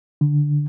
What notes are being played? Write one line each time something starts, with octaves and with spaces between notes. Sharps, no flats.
D3